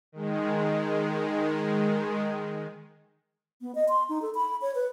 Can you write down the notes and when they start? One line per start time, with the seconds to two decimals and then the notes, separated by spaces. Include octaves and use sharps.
0.12 D#3 G#3
3.60 B3
3.75 D#5
3.89 C6
4.09 D#4
4.22 A4
4.35 B5
4.62 C#5
4.75 B4